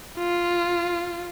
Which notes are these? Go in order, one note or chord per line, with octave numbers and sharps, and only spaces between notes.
F4